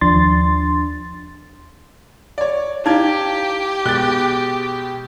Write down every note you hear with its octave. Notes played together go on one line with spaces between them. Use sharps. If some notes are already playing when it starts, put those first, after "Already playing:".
D#2 F3 D4 C6 A6
C#5 D5
D#4 E4 G4 F5 G#6
B2 G#3 F#6 A6 G7